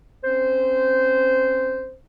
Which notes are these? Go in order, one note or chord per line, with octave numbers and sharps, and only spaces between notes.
C4 C#4 C5